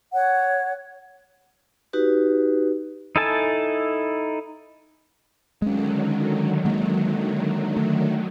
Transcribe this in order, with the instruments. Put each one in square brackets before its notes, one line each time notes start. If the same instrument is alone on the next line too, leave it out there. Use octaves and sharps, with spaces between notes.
[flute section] C#5 F#5
[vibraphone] D#4 F#4 G4 B4
[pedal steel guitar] D#4 E4 A4 G#5 A5
[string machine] D3 D#3 F#3 [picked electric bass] G#3 C#4
[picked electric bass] G#3 A#3
A3